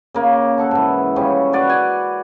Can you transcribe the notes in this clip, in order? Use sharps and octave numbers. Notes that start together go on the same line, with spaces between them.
C#3 A#3
A4 F#5 A5
G#2 E3
C#3 F3 G3 C#4
F#4 B4 D5 F#5
G#5 D6